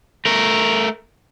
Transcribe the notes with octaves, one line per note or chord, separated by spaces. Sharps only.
A3 A#4